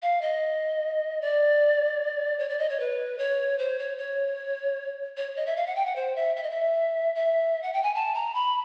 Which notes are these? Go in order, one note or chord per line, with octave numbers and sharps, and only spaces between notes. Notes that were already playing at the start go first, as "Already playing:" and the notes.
F5
D#5
D5
C#5
D5
D#5
C#5
B4
C#5
C5
C#5
C#5
C#5
D#5
E5
F5
F#5
G5
F#5
C5
E5
E5
D#5
E5
E5
F#5
G5
G#5
A5
A#5
B5